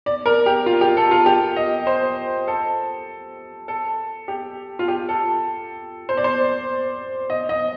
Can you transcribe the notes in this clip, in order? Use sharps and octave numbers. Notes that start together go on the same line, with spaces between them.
D5
A#4
G4
F4
G4
A4
F4
G4
D#5
C5
A4
A4
G4
F4
G4
A4
C5
D5
C5
D#5
D#5